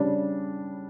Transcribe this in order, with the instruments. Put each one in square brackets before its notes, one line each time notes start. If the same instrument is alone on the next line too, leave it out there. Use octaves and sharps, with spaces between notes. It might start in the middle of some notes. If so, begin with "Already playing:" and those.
Already playing: [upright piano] C#3 G3 D4